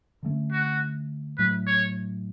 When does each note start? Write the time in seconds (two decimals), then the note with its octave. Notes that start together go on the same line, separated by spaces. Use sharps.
0.23 D3 F3 A3 C#4
0.52 F#4
1.38 A2 F#3 A3 B4
1.67 C#5